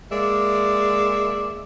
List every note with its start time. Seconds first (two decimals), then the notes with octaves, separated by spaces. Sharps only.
0.12 G#3 A#3 D5 E5